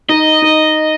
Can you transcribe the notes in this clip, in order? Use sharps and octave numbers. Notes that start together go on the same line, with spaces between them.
D#4 D#5
D#4